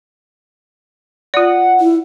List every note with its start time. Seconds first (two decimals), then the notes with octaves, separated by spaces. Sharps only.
1.34 F4 D5 F#5
1.81 E4